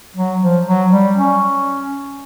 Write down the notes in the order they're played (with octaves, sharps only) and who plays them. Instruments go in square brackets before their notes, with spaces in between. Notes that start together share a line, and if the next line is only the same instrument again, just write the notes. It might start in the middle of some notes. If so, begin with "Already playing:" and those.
[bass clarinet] F#3
F3
F#3
G3
C#4